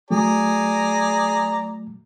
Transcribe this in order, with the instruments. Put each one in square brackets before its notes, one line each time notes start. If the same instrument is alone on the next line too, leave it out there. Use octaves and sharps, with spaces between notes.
[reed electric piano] F#3 A3 [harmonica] G#4 D5 A#5